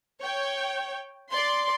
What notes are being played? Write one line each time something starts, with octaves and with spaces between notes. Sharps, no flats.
C#5 G5
D5 C6